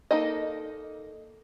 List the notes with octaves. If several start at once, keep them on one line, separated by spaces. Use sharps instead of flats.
A#3 D#4 A4 D#5